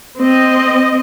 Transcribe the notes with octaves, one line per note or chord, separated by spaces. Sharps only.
C4 D#5